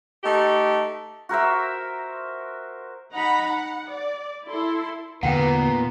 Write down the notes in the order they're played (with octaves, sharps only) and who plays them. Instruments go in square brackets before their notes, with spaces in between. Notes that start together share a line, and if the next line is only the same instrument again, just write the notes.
[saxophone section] A3 D#4 G4
[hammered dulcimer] F#4 A#4 C5 E5
[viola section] D#4 F#5 A#5 B5
F#5
D5
E4 A4 C6
[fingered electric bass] E2 D3 [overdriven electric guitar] A#2 [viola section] B3 [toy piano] F#5 G5